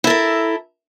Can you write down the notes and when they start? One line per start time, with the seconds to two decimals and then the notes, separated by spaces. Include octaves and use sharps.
0.04 E4
0.07 A4
0.10 A#4